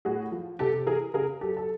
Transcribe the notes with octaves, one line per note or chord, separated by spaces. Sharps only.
A2 F#4 G#4
F3
C3 G4 A4
E3 G#4 A#4
C#3 G#4 A#4
F#3 G4 A4
A4